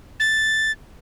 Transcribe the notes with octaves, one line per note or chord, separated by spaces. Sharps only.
A6